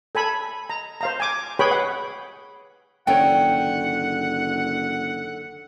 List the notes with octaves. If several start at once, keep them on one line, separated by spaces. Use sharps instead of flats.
A4 G#5 B5
A#5
C5 F5 A#5
G#5 D6
G#4 B4 C#5 G5 B5
F#5
F#1 D3 D#3 C#5 F#5 G5